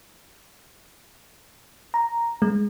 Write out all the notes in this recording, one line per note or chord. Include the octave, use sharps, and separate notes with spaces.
A#5
G#3